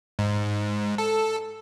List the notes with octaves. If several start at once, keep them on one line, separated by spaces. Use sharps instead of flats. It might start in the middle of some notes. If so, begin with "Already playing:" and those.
G#2
A4